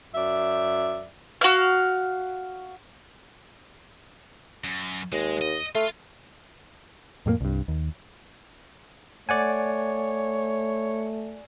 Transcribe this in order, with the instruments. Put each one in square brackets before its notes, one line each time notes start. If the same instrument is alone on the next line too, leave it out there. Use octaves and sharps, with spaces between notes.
[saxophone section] F#2 D5 E5
[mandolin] F#4 F5 F6
[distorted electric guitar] F#2
[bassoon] D#2 [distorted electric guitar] G#3
[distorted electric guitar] D#5
[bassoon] A3 [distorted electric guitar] F4
[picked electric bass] F2 A2 F#3 A#3
C2 G2
D#2
[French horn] A3 [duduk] C#5 [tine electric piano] D5 F#5 G#5